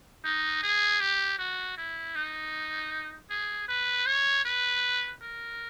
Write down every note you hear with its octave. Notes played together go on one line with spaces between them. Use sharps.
D#4
G#4
G4
F#4
E4
D#4
G#4
B4
C#5
B4
A#4